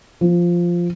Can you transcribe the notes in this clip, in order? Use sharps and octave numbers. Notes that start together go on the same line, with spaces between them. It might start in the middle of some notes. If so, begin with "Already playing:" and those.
F3